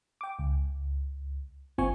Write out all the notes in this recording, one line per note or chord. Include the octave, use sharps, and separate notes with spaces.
G5 D6
C#2
G1 C4 F4 G#5 C#6